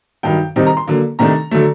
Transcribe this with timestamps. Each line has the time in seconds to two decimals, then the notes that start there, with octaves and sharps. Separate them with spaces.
0.23 G2 D#3 F#3 G5
0.56 C3 D#3 G3 C4 D#4
0.67 A#5
0.77 C6
0.87 D3 F#3 A#3
1.19 C3 D#3 A3 D4 A#5
1.51 D3 F#3 A3